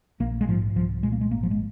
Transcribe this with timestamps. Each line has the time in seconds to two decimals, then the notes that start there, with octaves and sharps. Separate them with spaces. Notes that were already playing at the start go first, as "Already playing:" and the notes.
0.20 A#1 A#3
0.41 G#3
0.48 G#2 F3
0.76 C2 F3
1.03 A#2 G#3
1.12 A#3
1.21 G#3
1.31 G#1 A#3
1.43 F3
1.51 G#3